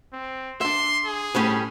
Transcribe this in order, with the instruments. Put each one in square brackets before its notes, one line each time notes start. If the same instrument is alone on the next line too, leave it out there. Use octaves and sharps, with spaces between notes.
[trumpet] C4
[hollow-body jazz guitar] D4 E5 [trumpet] C6
[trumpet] G#4
[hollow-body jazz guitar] A2 G3 C#4